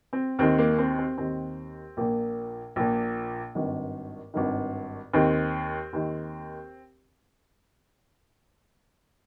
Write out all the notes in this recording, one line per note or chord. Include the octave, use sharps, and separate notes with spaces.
C4
D#2 D#3 C4
A#3
C4
C4
D#2 D#3 C4
A#1 A#2 A#3
A#1 A#2
G#1 G2 D#3
G#1 G2 D#3
D#2 D#3 C4
D#2 D#3